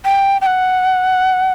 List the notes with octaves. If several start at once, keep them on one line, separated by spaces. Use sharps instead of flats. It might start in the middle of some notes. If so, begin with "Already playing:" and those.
G5
G5
F#5